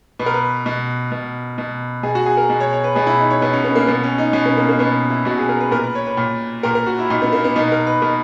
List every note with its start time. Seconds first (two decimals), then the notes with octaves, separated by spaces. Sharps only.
0.19 B2 B4
0.26 A#4
0.34 B4
0.66 B2
1.12 B2
1.58 B2
2.03 B2 G#4
2.15 F#4
2.26 G#4
2.37 A#4
2.50 B2
2.60 C#5
2.73 C#5
2.84 B4
2.95 B2 G#4
3.07 E4
3.19 D#4
3.30 C#5
3.42 B2 B4
3.53 C#4
3.64 B3
3.75 A#3
3.87 B2 B3
4.03 C#4
4.18 D#4
4.33 B2 C#4
4.46 B3
4.57 A#3
4.69 A#3
4.79 B2 B3
5.10 E4
5.25 B2 F#4
5.38 G#4
5.49 A#4
5.60 B4
5.71 A#2 A#4
5.84 B4
5.95 C#5
6.07 B4
6.17 A#2
6.63 A#2 A#4
6.75 A#4
6.87 F#4
6.99 E4
7.10 A#2 D#4
7.22 B3
7.33 A#3
7.44 B3
7.56 B2 D#4
7.72 A#4
7.87 B4
8.02 B2 A#4